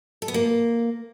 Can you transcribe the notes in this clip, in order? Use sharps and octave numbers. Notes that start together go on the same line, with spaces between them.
A4
B3
A#3